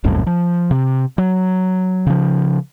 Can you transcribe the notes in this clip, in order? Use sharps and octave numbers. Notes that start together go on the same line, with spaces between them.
D#1 C2 F#2 A2
F3
C3
F#3
C#3 F3